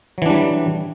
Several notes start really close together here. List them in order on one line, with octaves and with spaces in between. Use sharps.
F#3 E3 D4 G3